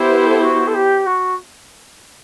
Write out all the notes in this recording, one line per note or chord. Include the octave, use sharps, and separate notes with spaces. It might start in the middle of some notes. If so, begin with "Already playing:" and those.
Already playing: B3 E4 G4 C5
B4
A4
F#4
A4
G4
F#4